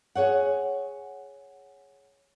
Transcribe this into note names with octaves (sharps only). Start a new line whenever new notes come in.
G#4 C#5 F#5